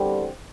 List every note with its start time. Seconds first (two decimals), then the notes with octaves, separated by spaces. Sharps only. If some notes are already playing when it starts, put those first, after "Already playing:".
Already playing: E2 D3 G3 C4